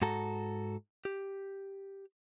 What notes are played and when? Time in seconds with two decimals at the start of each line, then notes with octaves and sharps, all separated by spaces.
0.02 G#2 F#4 A4 A#5
1.05 G4